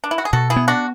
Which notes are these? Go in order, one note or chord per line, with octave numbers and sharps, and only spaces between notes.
D4
E4
F#4
G#4
B2 F#4 A4
E4 G#4
B3
D4 F#4